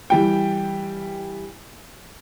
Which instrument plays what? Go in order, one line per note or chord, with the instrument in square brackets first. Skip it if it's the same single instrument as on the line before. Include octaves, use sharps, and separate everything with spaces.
[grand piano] E3 G3 G5